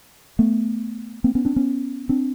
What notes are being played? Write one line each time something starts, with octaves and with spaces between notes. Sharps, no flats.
A3 B3
A#3 C4
B3 C#4
C4 D4
B3 C#4
C4 D4